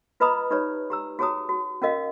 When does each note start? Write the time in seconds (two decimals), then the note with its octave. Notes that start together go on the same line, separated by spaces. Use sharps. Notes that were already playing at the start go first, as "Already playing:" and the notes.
0.20 F4 B4 D#5 A#5 B5 D#6
0.51 D#4 G4 B4 C#5 D5
0.90 G4 A#5 E6
1.19 F#4 G#4 C#5 A5 A#5 D#6
1.49 F#4
1.82 C#4 F#4 A#4 D#5 F5